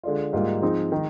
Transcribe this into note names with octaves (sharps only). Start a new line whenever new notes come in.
D3 G#3 D4 F4
G#2 G3 A#3 F4
F3 G#3 C4 D#4
D#3 G#3 D#4